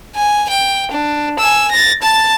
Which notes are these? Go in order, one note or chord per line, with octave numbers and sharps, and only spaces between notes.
G#5
G5
D4
G#5 E6
A6 A#6
A5 A6